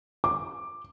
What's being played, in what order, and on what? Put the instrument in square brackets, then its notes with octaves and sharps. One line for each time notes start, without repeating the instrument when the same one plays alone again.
[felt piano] D6